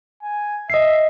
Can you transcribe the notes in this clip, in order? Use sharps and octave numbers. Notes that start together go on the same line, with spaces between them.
G#5
D#5 E5 C7